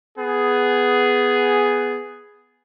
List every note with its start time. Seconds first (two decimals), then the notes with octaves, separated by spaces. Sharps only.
0.18 B3 G#4